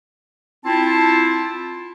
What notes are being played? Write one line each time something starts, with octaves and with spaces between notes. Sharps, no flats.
C4 E4 F4 A5